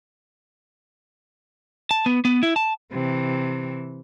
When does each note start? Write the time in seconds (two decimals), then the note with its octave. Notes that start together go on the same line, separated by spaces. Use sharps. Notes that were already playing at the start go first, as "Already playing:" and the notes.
1.91 A5
2.06 B3
2.25 B3
2.43 E4
2.56 A5
2.93 C3 E3